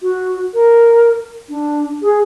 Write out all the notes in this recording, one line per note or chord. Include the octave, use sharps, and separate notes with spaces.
F#4
A#4
D4
G#4